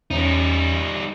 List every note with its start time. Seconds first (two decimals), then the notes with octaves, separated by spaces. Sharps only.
0.11 E2 G3 C#4 D#4